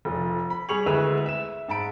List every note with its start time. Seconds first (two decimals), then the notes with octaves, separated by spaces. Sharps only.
0.05 F1 F3
0.50 B5
0.69 G3 G#4 B5 C#6 F7 F#7
0.86 D2 G#3 E4 B4 E6 F7
1.26 E5 E7
1.68 G#2 A5 B5 D7